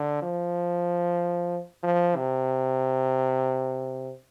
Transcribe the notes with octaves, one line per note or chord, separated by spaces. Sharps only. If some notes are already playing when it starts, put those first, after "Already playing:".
Already playing: D3
F3
F3
C3